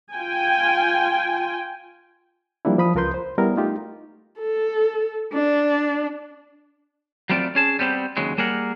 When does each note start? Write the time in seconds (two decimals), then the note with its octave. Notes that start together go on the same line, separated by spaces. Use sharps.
0.14 F4 G5 G#5
2.65 F3 G3 A#3 D4 E4
2.78 F3 B5 D#6
2.95 C#2 F4 A#4 B4 C6 G6
3.14 C5
3.38 G3 B3 E4 A#4
3.57 A3 D#4 F4 G4
4.40 A4
5.33 D4
7.30 F#3 G3 A3 C4 F4 D5
7.55 C#4 G#4 A5
7.79 G3 B3 C4 G4
8.17 D#2 C#3 F#3 G#3
8.38 G3 A#3 G#4 A#4 F#5